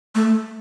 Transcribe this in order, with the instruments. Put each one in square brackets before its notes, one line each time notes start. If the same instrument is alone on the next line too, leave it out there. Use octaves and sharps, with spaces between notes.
[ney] A3